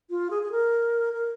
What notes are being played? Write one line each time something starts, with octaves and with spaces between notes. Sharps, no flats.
F4
G#4
G#4
A#4
A#4